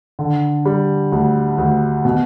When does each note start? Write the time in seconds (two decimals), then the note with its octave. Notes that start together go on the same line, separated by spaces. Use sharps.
0.19 D3
0.65 G3
1.12 D2
1.58 D2
2.05 B2